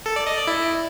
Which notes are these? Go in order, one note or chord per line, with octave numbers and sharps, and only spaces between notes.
A4
D5
D#5
D5
E4